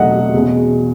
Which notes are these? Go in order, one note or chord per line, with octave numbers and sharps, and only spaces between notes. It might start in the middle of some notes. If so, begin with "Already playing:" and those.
Already playing: E2 B2 F#3 A3 D#4 D#5 E5 F#5
E2 B2 G#3 C#4